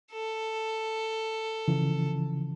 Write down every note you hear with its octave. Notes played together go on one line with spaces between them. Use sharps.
A4
C#3 E3 F3